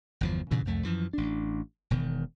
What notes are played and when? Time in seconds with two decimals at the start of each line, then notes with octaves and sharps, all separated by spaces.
0.21 G1 E2 F3
0.51 G2 A#2 C#3 E3
0.65 C2 F2 A3
0.83 F#2 E3 F3
1.13 A1 D4
1.90 E1 B2 D#3